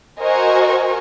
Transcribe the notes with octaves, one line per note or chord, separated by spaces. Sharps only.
F#4 A#4 C5 D#5 G#5 C#6